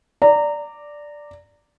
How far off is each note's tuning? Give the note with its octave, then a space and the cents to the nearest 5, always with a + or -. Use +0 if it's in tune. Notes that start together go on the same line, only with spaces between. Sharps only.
D5 +0 A#5 -20